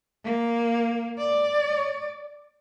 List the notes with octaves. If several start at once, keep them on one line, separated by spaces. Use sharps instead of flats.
A#3
D5